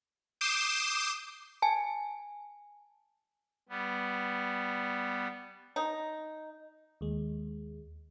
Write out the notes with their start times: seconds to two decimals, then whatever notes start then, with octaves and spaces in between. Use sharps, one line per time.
0.41 D6 D#6 G6 C7 E7
1.62 G#5 A5
3.69 G3 B3
5.76 D#4
7.01 D#2 G#3